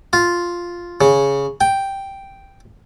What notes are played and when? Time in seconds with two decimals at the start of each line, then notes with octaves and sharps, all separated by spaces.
0.13 F4
1.01 C#3
1.61 G5